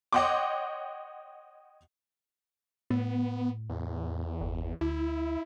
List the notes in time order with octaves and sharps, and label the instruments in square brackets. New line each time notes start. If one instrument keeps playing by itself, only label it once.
[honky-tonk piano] C#5 D#5 F#5 G5 C6 D6
[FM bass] A2 [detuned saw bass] B3
[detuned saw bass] E2
[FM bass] G1
[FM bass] D2 [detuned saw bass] E4